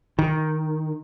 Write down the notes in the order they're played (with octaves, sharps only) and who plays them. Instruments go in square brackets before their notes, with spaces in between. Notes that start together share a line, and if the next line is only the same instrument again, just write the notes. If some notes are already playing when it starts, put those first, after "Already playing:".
[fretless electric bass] D#3